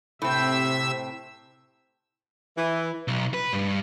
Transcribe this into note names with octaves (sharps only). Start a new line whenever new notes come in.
A2 C3 C4 E5 E6
E3
B1
B4
G2